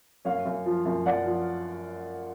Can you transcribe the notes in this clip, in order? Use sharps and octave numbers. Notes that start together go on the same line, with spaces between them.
F#2 C#5 F5
F#2
F3
F#2
F#2 D5 F#5
F3